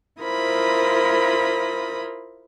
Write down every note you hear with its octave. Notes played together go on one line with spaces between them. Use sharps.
E4 F4 A#4 C5 B5 D#6